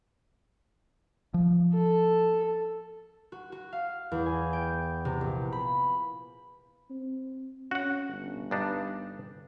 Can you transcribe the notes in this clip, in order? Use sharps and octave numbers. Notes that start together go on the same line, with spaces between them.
F3
A4
F#4
F#4
F5
E2
G#5
G5
C3
A#1
B5
C4
C#4 F#4 F#5
G1
G2 D4 D#4